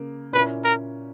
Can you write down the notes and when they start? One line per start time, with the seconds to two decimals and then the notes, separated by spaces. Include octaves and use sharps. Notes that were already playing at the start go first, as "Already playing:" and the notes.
Already playing: C#3 A#3
0.33 A#2 A#3 C#4 E4 B4
0.64 A#4